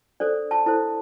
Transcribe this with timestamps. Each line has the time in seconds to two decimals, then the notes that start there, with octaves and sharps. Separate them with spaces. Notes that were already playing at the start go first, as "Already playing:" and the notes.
0.20 D4 A4 C5 D5
0.51 A5
0.66 E4 A4 C5 A5